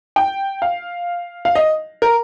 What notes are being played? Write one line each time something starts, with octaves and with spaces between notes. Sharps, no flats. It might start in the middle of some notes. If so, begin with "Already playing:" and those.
G5
F5
F5
D#5
A#4